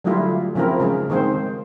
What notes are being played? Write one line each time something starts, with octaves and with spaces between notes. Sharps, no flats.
D3 F#3 G3 A3 E4 F4
C#3 F3 C4 E4 A#4
C#3 G#3
D#3 G#3 C4 C5